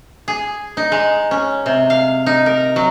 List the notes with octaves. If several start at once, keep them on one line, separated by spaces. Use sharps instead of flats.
G#4
D#4
G#3
C#4
C3
F5
D#4
A#4
F#3